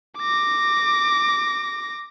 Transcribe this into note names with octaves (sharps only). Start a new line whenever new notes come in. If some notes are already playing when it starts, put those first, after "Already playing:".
D6 A#6